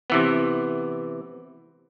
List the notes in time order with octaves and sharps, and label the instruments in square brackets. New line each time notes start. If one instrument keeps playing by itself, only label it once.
[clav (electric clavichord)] C3 E3 B3